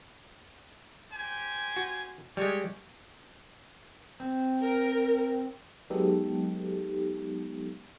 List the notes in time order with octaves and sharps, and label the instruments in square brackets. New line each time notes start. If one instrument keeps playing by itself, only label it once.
[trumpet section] G4 C5 G#5
[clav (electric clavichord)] F#4
[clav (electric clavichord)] G3 G#3 [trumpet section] C4 G4 C#5
[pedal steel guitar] C4
[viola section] A#4
[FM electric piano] F#3 G#3 B3 D#4 G4 A4